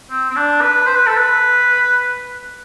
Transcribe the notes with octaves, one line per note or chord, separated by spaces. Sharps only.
C4
C4
D4
B4
C5
B4
A4
B4